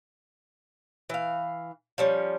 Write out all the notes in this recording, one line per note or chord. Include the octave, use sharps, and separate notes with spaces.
E3 F5
F3 G3 C#4